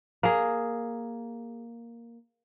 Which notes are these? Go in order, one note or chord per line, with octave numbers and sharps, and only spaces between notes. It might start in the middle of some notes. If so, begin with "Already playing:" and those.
A#3 G#4